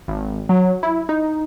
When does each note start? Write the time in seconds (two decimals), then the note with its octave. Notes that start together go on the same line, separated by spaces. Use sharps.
0.08 G#1
0.49 F#3
0.83 E4
1.09 D#4